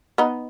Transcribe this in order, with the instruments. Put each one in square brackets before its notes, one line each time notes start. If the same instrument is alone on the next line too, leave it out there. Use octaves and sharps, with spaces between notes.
[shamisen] B3 D#4